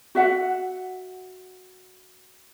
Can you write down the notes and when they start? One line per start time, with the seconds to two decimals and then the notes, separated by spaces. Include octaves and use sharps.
0.15 F#4 E5 F#5